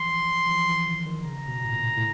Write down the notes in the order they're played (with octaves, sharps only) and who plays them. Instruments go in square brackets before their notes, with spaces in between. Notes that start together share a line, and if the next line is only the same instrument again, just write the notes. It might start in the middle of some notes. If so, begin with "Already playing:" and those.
Already playing: [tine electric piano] E3 F3 [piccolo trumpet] C6
[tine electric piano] E3
F3
E3
D#3
D#3
[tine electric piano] C#3 [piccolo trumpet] A#5
[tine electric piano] B2
A2
A#2
A2